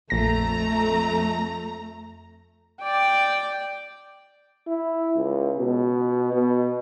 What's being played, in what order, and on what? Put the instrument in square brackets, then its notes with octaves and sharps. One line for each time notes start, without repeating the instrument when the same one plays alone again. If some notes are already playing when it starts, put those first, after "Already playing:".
[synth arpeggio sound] A#1 A#6 [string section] F2 A3 A#5
[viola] D5 G5
[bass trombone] E4
C#2
B2
B2